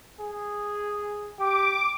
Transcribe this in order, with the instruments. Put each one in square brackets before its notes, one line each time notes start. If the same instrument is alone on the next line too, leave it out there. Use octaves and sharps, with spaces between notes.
[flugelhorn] G#4
[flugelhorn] G4 [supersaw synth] D6